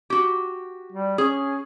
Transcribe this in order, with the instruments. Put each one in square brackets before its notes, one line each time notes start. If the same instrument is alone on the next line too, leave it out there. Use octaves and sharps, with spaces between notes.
[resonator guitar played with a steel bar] F#4 G4
[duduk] G3
[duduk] C#4 [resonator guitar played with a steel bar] G#4